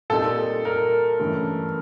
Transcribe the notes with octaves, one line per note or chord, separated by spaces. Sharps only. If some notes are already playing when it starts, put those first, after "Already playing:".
A#2 G3 C4 D#4 A4
A#4
G2 E3 A3 C#4